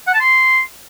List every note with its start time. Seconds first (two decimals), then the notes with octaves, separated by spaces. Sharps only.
0.07 F#5
0.14 A5
0.20 C6